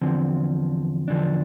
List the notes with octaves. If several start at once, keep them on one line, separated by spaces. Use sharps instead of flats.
E2 D3 F3 C4
E2 D3 F3 D4